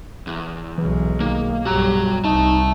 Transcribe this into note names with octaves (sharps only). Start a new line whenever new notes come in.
E2
B1 E3 G#3
D#3 A#3
B1 G2 F#4 G4 A#5
C2 D#4 E5 A5